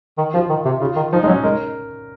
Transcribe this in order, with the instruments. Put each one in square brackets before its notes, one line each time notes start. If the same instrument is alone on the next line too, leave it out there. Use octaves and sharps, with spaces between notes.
[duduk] D#3
[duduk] F3 [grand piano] F4
[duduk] D#3
C3
[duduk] C#3 [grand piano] F4
[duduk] D#3
[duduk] F3 [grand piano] D#4
[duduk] G#3 [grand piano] D#4
[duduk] F#3 [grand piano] C#4
[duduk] G#3 [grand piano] A#4